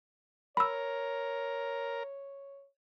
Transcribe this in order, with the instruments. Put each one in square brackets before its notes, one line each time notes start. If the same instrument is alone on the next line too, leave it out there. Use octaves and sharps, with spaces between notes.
[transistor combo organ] A#4 [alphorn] C#5 [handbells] B5 E6